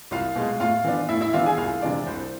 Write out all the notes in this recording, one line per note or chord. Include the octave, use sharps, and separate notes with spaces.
C2 F4 F5
B2 G#3
A2 F4 F5
E3 B3 D4
A2 E4 E5
E4 E5
E3 B3 D4 F4 F5
G#4 G#5
C2 F4 F5
C3 E3 G#3 D4 D5
C2 C5